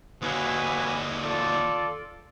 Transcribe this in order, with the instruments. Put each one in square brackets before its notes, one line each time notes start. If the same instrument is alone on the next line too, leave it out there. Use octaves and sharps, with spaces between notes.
[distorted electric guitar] D#2 D3 [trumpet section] F#4 B4 G#5
[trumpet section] F4 A4 D5